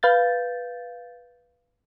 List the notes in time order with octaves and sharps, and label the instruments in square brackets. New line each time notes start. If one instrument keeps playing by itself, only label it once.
[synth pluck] B4 F5 G6 A6